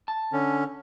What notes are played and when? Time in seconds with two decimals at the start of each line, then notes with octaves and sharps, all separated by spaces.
0.08 A5
0.32 D3 C#4